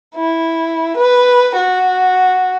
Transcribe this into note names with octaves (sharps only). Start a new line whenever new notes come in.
E4
B4
F#4